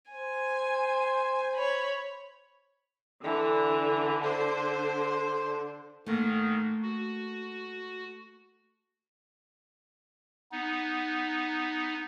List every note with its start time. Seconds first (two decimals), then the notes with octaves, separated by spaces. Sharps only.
0.12 C5 G#5
1.57 C#5 B5
3.24 D3 E3
4.23 C5
6.06 G#2 D#3 A3 A#3
6.83 F#4
10.52 B3 D#4